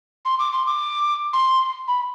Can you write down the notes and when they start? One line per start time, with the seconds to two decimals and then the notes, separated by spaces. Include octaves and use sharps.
0.25 C6
0.39 D6
0.53 C6
0.66 D6
1.33 C6
1.87 B5